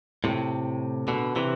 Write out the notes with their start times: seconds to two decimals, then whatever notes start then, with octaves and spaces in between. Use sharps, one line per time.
0.24 A2 C3
1.08 B2 D3
1.36 C3 E3